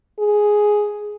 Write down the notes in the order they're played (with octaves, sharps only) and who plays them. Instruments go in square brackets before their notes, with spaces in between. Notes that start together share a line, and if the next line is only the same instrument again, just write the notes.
[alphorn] G#4